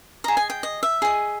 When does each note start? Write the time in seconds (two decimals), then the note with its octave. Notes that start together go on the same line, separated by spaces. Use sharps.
0.24 G#4 D#5 A#5
0.37 G#5
0.50 G5
0.63 D#5
0.83 E5
1.02 G#4 D#5